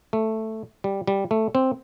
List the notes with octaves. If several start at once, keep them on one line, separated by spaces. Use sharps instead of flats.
A3
G3
G3
A3
C4